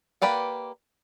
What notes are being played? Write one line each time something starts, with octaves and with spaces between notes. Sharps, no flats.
A#3 G4 B4 D5 F#5